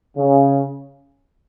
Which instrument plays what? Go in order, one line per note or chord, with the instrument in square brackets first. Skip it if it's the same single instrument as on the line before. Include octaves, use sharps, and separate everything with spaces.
[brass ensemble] C#3